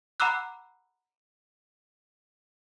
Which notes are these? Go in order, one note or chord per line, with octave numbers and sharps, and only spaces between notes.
F#5 A#5 B5 D6 E6 F#6